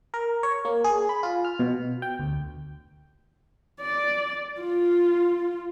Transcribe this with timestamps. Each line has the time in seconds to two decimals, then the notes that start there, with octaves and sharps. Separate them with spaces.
0.14 A#4
0.43 C#5
0.65 A#3
0.84 G#4
1.09 B5
1.23 F4
1.45 F6
1.59 B2
2.02 G5
2.19 D2
3.81 D5
4.61 F4